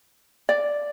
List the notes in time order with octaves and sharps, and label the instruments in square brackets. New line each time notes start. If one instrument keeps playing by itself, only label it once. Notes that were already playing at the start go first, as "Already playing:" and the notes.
[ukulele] D5